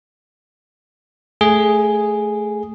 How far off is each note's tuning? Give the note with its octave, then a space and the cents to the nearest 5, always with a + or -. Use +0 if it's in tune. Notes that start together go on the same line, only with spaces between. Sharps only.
A3 -15 G#4 +0